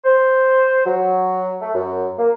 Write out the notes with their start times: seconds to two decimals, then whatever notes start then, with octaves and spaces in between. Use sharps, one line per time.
0.04 C5
0.85 F#3
1.61 A3
1.74 F#2
2.18 A#3